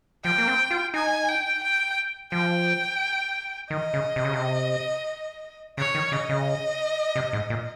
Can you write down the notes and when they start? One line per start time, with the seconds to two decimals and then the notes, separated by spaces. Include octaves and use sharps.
0.24 F3 G5
0.38 A#3
0.48 C4
0.71 F4
0.94 D#4 G#5
1.28 G5
1.63 G5
2.32 F3 G5
3.70 D#3 D#5
3.93 C#3
4.16 C3
4.25 C#3
4.33 C3
5.78 C#3 C#5
5.95 D#3
6.12 C#3 D#5
6.29 C#3
7.16 C3
7.33 G#2
7.50 A#2